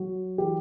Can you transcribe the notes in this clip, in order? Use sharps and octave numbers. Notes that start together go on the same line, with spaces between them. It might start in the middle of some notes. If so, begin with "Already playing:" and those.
Already playing: F#3 F#4
E3 G4